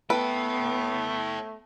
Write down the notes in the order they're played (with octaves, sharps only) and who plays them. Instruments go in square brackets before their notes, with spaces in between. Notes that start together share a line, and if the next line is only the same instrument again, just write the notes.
[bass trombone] A3 [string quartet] B3 [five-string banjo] A4 B4 [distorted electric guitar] C#5 G5